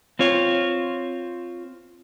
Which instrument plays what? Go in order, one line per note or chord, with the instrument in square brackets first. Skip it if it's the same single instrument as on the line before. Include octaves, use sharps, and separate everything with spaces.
[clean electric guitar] C4 F4 C#5